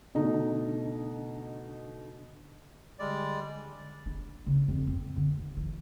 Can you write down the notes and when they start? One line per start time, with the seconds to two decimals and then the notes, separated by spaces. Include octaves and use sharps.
0.15 B2 D3 A3 D4 D#4 D#5
2.99 D3 G3 G#3 D5
4.06 D4
4.46 C#3
4.68 F2
4.87 C4
5.16 D3
5.37 D#2
5.57 E3